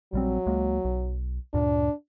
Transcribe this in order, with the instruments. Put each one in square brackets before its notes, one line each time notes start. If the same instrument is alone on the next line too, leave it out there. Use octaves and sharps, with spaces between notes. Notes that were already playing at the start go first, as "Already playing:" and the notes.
[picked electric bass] A#1 G3 C4 [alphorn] F#3
[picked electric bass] C#2 G#3 A#3
B1
[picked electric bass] D2 G2 A#2 [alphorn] D4